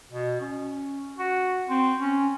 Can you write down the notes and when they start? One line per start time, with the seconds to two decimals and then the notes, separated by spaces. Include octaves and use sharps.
0.12 B2
0.41 C#4
1.19 F#4
1.69 C4
2.00 C#4